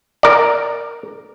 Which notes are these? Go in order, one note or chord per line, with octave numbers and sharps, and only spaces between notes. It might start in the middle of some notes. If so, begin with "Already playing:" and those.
A#4 D5